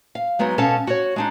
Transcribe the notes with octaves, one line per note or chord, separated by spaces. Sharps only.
F5
F#3 G#3 B3 D#4 F#4
B2 C#4 A4 F5 A5
F#4 C#5
G#3 D4 D#4